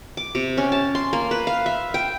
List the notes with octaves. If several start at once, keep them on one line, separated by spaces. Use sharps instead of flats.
D6
C3
C#4
A5
C6
A#3
B4
F5
E5
G5